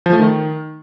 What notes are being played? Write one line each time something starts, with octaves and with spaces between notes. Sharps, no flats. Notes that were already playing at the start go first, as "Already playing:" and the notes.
F3
A3
D#3